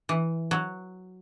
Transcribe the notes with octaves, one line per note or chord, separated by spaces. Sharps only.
E3
F#3